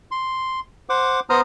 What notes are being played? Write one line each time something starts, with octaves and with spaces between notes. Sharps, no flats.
C6
C5 F#5 D6
B3 C5 A#5 D#6 F6